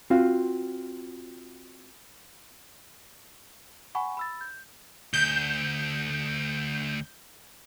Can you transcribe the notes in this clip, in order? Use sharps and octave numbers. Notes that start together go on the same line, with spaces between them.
C4 F4 F#4 F5
F#5 G#5 B5 C#6
B5 E6 A6
G6
D2 G6